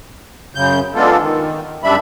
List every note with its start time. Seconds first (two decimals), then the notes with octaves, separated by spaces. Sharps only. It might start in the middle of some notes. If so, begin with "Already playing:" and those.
0.55 F#2 C#3 G6
0.95 G#3 B3 D4 F4 A4
1.21 D#3
1.84 F#2 G3 D4 E5 B5